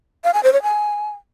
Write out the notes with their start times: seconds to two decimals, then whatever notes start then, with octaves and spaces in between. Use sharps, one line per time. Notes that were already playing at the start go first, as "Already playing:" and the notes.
0.24 F5
0.34 G#5
0.43 C5
0.53 C#5
0.63 G#5